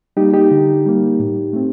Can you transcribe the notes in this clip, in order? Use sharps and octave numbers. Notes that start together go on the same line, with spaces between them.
G3 A#3 D#4 G4
D#4 G4
D3
G3 A#3
A2
A3 C4